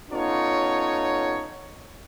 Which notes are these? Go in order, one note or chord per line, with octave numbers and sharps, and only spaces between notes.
B3 C#4 D#4 F4 A4 C#5